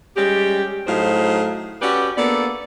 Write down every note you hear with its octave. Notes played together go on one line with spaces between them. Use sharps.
G3 G#3 C#4 G4
A2 F#3 D#4 G#4 C5 F5
C#4 F#4 G4 A4 B4 D5
A#3 B3 D4 A4 D5